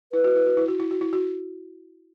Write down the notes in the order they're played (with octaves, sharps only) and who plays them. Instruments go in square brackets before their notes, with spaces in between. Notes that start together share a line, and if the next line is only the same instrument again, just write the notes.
[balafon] E4 [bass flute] B4
[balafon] F#4
E4
F#4
E4
F#4
E4
F#4
E4
F#4